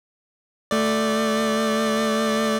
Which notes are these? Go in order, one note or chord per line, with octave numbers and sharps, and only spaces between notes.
A3 D5